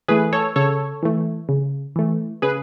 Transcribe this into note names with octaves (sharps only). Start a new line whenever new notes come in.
E3 A3 G#4 B4
A4 C#5
C#3 A4 C#5
E3 A3
C#3
E3 A3
C#3 G#4 B4